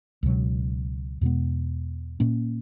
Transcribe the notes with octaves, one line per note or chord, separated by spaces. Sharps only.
C#2 B2 F#3
E2 B2 G#3 B3
A#2 A#3 C#4